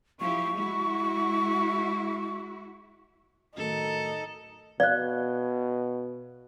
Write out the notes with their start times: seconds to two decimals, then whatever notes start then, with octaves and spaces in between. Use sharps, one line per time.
0.20 F3 E4 G4 C#6
0.56 G#3 E4 F#4
3.57 A2 D#3 F#3 D#4 A4
4.80 B2 D5 F5 F#6